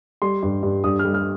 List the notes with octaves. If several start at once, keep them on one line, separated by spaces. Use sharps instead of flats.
G3 C6
G2
G2
G2 D#6
G3 F6
F6